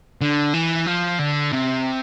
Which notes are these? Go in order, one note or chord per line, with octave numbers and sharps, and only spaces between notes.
D3
E3
F3
D3
C3